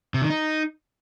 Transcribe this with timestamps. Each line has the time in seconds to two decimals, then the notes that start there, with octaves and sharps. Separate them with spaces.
0.14 C3
0.22 D#3
0.30 D#4